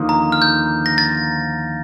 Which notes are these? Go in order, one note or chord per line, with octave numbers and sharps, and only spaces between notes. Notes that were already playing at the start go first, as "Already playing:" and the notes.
Already playing: D#2 D3 F3 A#3 D#4
A#5
F6
G6
A#6
A6